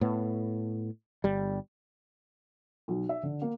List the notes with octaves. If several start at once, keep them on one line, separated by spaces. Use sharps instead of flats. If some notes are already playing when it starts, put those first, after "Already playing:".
A2 B3
G1 G3
B1
E5
D3
A#3